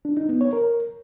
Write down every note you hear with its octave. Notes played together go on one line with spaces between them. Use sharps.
D4
D#4
B3
C#5
A#4